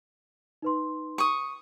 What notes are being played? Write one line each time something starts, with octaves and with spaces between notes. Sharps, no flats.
D#4 B4 C6
C#6 D#6